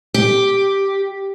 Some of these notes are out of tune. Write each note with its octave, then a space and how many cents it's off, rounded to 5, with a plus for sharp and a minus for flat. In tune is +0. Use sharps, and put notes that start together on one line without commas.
G4 +0